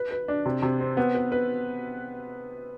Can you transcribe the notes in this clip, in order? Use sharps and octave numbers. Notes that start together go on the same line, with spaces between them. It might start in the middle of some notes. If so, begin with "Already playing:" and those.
Already playing: B4
B4
D4
C3
C3
C4
B3
B4
B4